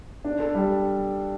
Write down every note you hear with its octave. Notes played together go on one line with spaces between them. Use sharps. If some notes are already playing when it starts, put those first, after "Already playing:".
D4
A4
G3